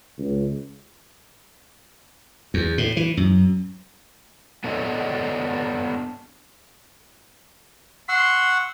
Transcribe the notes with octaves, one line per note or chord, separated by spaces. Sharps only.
C#2
E2
A2
E3
F#2
B3 D4 A4 C#5 D#5
F#5 C6 C#6 E6